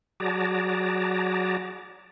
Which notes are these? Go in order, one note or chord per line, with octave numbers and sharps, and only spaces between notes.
F#3 F#4 G#4 D5 A5 A#5